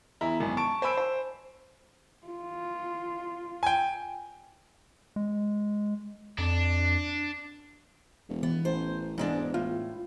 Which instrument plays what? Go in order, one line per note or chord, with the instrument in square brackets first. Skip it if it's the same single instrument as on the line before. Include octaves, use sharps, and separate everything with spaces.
[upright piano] E2 E4 A#5
G#1 F#2 B2
A5 C#6 D7
C5 G#5 B5 E6 D7
C5
[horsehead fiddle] F4
[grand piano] G5 G#5
[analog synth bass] G#3
[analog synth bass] F2 [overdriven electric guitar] D4
[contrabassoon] E1
[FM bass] E3 [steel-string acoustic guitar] B3
[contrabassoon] A1 [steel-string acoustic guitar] C5
[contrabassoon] E1 [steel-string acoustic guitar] G#2 G#3 D4
[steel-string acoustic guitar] A2 [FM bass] F4